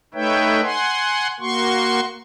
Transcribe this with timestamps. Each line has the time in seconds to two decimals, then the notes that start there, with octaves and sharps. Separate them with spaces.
0.14 A3 D#4 B4 C#5 E5 G5
0.63 F#5 G#5 C6
1.40 A#3 F#4 C6 C#6